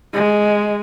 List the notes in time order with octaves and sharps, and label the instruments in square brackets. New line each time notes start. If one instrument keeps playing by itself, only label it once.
[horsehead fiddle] G#3